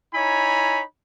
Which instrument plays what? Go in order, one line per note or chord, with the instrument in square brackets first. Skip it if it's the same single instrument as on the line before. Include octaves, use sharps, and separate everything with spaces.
[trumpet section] D#4 E4 C#5 G#5 A#5 B5